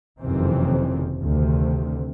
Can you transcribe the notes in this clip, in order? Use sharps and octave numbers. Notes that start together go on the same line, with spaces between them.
F#1 F2 C3 D#3 E3 C4
D2 C3 D#3